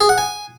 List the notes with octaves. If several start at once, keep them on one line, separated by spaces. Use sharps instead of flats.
G#4
F#5
G#5